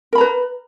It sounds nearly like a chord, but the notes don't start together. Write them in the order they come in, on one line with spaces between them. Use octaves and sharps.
A#4 B5 A#5 B4